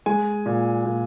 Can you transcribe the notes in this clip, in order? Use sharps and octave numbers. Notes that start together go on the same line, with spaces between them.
G#3 G#5
A#2
A#2